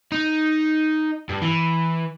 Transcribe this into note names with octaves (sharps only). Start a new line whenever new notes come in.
D#4
G2
E3